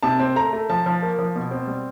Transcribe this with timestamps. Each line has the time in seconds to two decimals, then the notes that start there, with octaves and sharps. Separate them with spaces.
0.03 C3 A5
0.19 C4
0.36 A3 A#5
0.53 A3
0.69 F3 A5
0.86 F3
1.02 A#3
1.19 F3
1.35 B2
1.51 C4
1.67 G3